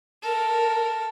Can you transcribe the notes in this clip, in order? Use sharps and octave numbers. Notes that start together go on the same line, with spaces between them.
A4 A#4